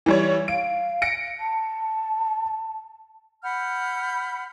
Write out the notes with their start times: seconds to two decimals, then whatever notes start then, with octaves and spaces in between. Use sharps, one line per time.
0.06 E3 G3 C#5
0.48 F5 D7
1.02 A#6 C#7 D7
1.40 A5
3.43 F#5 B5 F6 G6